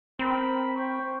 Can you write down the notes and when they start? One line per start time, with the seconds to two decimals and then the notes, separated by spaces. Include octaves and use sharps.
0.19 C4 A#4 B5
0.75 C5 G5 C#6